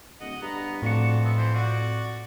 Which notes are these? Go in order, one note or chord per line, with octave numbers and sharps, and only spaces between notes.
D1 D#5 F#5
G2 B3 A#5
F2 A2 D4 F#4 C#7
B3 E5
E3 C5
F#4 D5